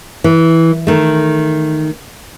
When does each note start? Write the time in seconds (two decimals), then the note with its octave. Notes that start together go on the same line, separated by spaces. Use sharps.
0.24 E3
0.87 D#3 A3